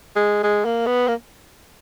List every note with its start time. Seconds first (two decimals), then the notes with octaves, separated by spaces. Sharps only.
0.16 G#3
0.43 G#3
0.65 A#3
0.86 B3
1.08 A#3